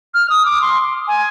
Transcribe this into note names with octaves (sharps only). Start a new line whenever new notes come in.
F6
D#6
D6
C6
G#5